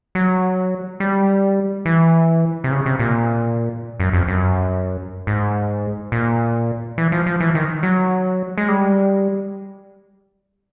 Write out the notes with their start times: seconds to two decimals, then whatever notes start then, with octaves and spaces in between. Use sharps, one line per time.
0.15 F#3
1.00 G3
1.85 E3
2.64 C3
2.71 C#3
2.86 C3
2.99 A#2
4.00 F#2
4.13 F2
4.28 F#2
5.27 G#2
6.12 A#2
6.98 E3
7.12 F3
7.26 F3
7.40 E3
7.55 D#3
7.83 F#3
8.58 G#3
8.68 G3